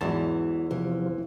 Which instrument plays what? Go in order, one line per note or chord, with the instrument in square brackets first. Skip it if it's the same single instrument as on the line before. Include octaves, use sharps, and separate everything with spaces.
[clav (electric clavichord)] E2 A5 [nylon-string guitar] G#2 E3 [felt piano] F#3 E4 F#4
[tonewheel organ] C3 F3 [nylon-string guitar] E3